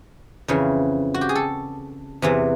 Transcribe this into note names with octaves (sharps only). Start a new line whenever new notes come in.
F2 C#3 E3
F#4
G4
G#4
A4
E2 C3 E3